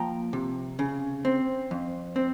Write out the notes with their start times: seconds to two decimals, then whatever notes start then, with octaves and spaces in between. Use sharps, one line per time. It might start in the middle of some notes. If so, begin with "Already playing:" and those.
Already playing: F3 A#3 G5 A#5
0.33 C3
0.79 C#3
1.25 C4
1.71 F2
2.16 C4